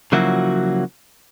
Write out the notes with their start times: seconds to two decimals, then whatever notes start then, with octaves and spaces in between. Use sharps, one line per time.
0.12 C#3 F3 F#3 A#3 E4 F#4